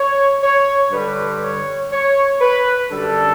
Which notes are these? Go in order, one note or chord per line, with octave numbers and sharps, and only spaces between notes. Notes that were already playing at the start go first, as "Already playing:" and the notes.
Already playing: C#5
C#5
G2 D3 G3 B4
C#5
C#5
B4
F#2 D3 G3 D4 A4